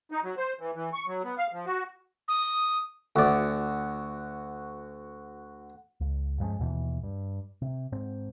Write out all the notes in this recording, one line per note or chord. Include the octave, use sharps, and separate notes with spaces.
D#4
F#3
C5
E3
E3
C#6
F#3
B3
F5
F3
F#4
D#6
D2 F#4 D5
C#2
G2 F3 G#3 C#4
D#2 B2 E3
G2
C3
G#2 C4